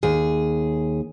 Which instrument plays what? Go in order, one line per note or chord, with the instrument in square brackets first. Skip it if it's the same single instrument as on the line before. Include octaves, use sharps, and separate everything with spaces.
[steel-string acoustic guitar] D#2 G#4